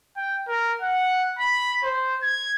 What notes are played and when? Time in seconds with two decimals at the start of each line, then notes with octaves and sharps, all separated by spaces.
0.17 G5
0.49 A#4
0.82 F#5
1.39 B5
1.83 C5
2.22 G#6